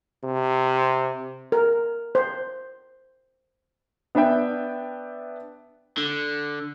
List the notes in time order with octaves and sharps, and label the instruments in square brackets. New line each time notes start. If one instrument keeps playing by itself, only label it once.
[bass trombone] C3
[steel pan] A#4
C5
[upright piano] B3 D4 B4 E5 G5
[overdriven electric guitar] D3